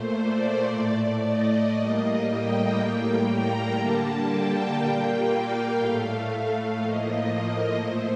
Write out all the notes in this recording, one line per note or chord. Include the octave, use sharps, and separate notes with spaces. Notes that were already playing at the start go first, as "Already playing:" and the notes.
Already playing: A#2 A3 C5
D5
A2 A3 D5
D#5
A2 G3 A#3 D#5
G5
A2 G3 A#3
A#5
D3 G3 A#3 A5
G5
A#2 G3 A#3
F5
A2 A3
A2 F3 A#3 D#5
D#5
A#2 A3 C5